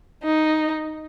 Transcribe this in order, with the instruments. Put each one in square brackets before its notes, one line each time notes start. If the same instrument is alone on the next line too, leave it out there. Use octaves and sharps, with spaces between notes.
[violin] D#4